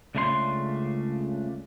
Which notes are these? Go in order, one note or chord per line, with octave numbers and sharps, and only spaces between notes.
C#2 C#3 A3 D4 C5 C6